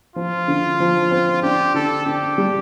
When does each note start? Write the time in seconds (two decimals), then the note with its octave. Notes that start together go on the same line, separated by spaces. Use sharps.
0.16 F3 F4
0.48 D3
0.80 F3
1.11 C4
1.43 D4 G4
1.74 D3 A4
2.06 D4 G4
2.38 G3